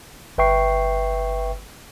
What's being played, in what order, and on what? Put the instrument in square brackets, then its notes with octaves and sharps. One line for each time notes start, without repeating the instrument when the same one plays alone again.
[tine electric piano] G1 B4 E5 G5 C#6 C7